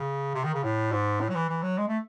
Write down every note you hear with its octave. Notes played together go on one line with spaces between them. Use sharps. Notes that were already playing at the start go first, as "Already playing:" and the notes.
Already playing: C#3
C3
D#3
C#3
A2
G#2
A2
F#3
E3
E3
F#3
G#3
A3